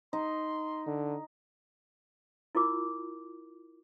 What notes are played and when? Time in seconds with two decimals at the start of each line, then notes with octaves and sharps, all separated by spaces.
0.13 D#4 C6
0.87 D3
2.55 E4 F4 A#4 D6